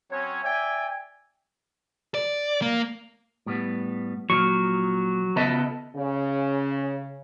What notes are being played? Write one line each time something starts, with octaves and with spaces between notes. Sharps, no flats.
F#3 C4 C#4 C#5
D5 E5 G5 G#5
D5
A#3
A2 G3 B3
A#2 F3 F#3 C#6
C#3 B3 A4 D#5 E5 A5
C#3